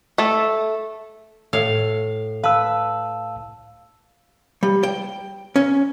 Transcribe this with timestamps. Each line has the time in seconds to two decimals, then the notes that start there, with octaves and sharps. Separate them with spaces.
0.18 A3 A4
1.53 A2 F5
2.44 B4 F5 A5 E6
4.63 G3
4.83 G5
5.56 C#4